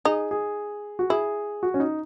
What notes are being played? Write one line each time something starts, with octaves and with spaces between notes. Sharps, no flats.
D#4 G#4
G#4
F#4
E4 G#4
F#4
C#4
D#4